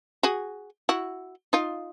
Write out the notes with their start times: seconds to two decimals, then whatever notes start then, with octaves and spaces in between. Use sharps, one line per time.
0.23 F#4 G#4
0.89 E4 F#4
1.53 D#4 F4